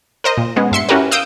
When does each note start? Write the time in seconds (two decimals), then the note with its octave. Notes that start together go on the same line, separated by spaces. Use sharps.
0.24 A#4 C5 D#5
0.37 A#2
0.56 G#3 B3 C#4
0.72 G2 E5 C6 C#7
0.89 C#4 E4 F#4 G4 A#4 B4
1.11 F5 D#6 E6 G6 D7